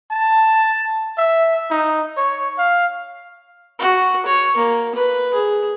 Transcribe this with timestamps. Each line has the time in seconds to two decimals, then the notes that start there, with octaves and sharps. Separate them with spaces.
0.11 A5
1.18 E5
1.71 D#4
2.17 C#5
2.58 F5
3.79 F#4
4.26 C#5
4.57 A#3
4.95 B4
5.34 G#4